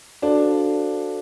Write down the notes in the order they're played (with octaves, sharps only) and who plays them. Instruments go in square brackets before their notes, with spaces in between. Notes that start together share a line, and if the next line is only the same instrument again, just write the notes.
[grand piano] D4 [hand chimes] F#4 A4 C5 F5 A5